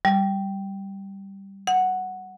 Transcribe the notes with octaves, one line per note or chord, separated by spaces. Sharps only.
G3
F#5